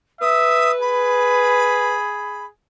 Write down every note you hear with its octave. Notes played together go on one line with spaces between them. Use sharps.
B4 E5 D#6
G#4 B5